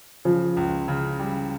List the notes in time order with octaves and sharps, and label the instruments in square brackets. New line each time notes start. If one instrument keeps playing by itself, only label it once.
[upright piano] C#3 [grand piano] F3
[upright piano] C#2
C#3
G3